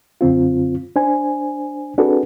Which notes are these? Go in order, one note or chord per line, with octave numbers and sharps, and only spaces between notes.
F#2 D3 C4 F4
D4 C5 G#5
C4 D4 F#4 G#4 A4 B4